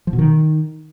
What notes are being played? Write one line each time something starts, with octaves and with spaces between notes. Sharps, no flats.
F3
B2
D#3